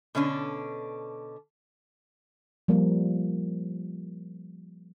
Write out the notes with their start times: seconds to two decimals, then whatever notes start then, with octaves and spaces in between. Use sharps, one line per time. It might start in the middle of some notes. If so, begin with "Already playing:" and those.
0.15 B2 D3 C#4 D4
2.68 F3 G3 A#3